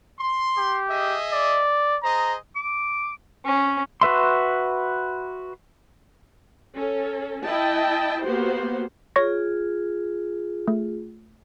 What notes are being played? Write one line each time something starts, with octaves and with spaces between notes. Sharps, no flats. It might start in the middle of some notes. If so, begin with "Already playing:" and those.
C6
G4
G#4 D#5 E5
D5
G#4 C5 D#5 A#5
D6
C#4
F#4 B4 E5 C6
C#4 A4
E4 D#5 G5 A5
A#3 B3 F#4 G4 C5
F4 G#4 C#5 C#6 A#6
A3